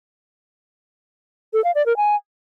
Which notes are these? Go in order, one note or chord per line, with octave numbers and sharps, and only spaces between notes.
A4
F5
D5
A#4
G#5